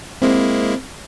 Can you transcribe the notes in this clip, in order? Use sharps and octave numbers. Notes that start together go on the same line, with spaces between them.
G#3 A#3 C4 E4